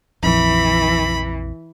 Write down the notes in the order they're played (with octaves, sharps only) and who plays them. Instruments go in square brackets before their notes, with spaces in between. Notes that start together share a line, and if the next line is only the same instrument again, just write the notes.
[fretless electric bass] A#1 F2 [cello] E3 [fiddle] B5